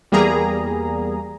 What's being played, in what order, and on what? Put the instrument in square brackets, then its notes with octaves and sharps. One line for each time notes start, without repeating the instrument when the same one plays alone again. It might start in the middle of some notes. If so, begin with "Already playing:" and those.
[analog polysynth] E2 G3 A#3 G#4 A#5